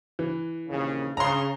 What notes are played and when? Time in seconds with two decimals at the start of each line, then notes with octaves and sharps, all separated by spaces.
0.19 E3
0.69 A#1 D#2 C#3
1.17 C#3 A#5 C6